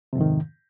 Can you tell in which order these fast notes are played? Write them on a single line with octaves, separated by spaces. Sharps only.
C3 F2 G#2 D#3